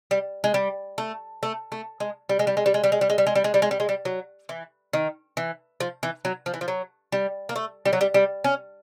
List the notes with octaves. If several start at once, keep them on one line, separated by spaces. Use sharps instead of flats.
G3
G#3
G3
A3
A3
A3
G#3
G3
G#3
G3
G#3
G3
G#3
G3
G#3
G3
G#3
G3
G#3
G3
G#3
G3
G#3
G3
G#3
G3
F#3
E3
D#3
E3
F3
E3
F#3
F3
E3
F3
F#3
G3
A#3
A3
G3
F#3
G3
G3
C#4